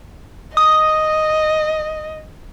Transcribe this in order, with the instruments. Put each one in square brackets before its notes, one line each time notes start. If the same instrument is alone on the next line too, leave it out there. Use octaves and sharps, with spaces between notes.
[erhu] D#5 [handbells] D#6